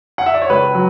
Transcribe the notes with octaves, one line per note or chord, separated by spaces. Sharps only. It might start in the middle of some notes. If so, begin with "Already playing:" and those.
F#5
E5
D5
C#5
C#2 B4
F#3